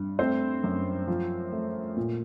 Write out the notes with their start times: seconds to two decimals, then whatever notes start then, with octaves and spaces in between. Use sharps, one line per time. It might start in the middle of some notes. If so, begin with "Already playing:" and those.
Already playing: G2
0.19 A3 C4 C5
0.64 F#2
1.07 F3
1.52 A3
1.96 A#2